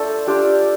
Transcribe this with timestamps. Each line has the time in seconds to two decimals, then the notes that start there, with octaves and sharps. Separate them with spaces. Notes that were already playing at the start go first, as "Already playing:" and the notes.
Already playing: A3 D4 F4 A4 C5
0.27 D4 F4 G4